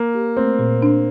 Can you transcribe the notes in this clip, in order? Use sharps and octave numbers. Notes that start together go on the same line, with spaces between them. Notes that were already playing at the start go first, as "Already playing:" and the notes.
Already playing: A#3
G4
A3 C4
A#2
D4